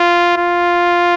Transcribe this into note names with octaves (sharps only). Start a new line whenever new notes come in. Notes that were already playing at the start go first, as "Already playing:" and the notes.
Already playing: F4
F4